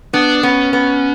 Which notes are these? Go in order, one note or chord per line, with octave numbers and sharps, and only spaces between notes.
B3 D4
B3 C#4
B3